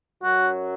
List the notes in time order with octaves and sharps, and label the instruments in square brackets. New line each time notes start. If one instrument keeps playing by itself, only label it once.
[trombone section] F#2 F#3 [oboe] F#4